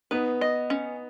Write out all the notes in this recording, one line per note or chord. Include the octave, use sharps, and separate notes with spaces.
B3 D#4 B4
D#5
C#4